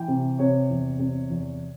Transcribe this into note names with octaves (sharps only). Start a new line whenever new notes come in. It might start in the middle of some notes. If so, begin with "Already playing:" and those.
Already playing: E3 G5
C3
C3 C#5
E2
C3
E2